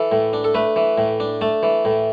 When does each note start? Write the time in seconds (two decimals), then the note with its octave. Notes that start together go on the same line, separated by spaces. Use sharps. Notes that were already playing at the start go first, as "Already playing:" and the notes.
Already playing: E3 A4
0.12 A2
0.33 D4
0.44 A4
0.54 A3 B4
0.76 E3
0.98 A2
1.20 D4
1.41 A3 A5
1.63 E3
1.85 A2